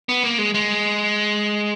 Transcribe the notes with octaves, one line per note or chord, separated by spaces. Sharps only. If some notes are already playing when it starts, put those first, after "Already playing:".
B3
A#3
G#3
G#3